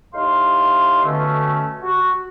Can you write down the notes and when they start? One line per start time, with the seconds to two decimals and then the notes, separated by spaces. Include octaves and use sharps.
0.14 A2 D#4 G4 F5 C6
1.04 B2 D3 A3 C#4
1.82 F#4